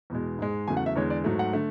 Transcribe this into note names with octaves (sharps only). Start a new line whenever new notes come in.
E2 B2 G#3
G#2 G#3
E2 C#3 F#3 A3 G#5
F#5
E5
E2 D3 G#3 C#5
D5
G#2 F#3 A3
F#5
D3 A3